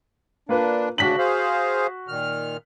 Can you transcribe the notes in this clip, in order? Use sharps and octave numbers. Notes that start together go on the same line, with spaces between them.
A#3 D4 F4 B4
D2 C#3 D4 F#4 B6 F#7
G#4 C5 F5
A#2 D#3 F6